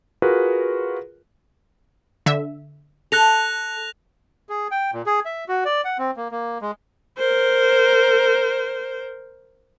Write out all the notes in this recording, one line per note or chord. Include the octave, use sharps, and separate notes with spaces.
F4 F#4 G#4 A#4 B4
D3 E5
A4 F#6 A#6 F7
G#4
G5
A#2
G#4
E5
F#4
D5
F#5
C4
A#3
A#3
G#3
A#4 C5